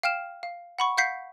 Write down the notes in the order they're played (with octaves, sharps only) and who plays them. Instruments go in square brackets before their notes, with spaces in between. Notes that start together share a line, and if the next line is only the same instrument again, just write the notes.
[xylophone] F5 G5 F6 E7
F5
F#5 B5 C#6
F5 F#5 G6 B6 C7